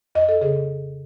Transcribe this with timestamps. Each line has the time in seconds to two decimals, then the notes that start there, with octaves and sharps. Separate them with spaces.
0.15 F2 D#5
0.29 A4
0.41 C#3 G#4